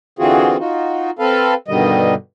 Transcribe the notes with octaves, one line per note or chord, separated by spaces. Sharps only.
D3 E3 C4 F4 F#4 G#4
D#4 F4 F#4
C4 A4 B4 F5
G2 B2 D3 D#3 G3 D#5